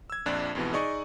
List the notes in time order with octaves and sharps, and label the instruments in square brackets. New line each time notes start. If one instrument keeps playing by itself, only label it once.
[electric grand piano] E6 G#6
A#1 F2 D4 D5 F#6
F2 G#2 B2 E3
D#4 G#4 D5 D#5 C#6